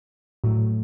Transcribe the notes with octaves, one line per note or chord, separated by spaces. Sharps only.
A2 F#3 A3